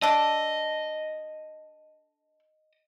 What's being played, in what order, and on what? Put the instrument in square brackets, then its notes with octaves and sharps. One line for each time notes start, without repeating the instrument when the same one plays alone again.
[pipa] D4 A4 [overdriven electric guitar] D#5